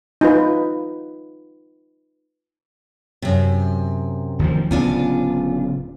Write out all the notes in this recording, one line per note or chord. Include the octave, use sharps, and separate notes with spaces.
D#4 F4 B4
F#2 C3
D2 D#3 F3
D1 C#3 B3 D4 F4 G#5